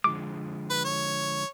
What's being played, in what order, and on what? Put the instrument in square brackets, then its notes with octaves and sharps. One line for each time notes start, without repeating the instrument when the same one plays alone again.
[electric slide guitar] D3 F3 G#3 [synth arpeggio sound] D6
[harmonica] B4
C#5